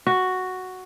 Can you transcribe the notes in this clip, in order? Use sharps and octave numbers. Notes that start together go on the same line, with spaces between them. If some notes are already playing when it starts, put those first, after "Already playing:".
F#4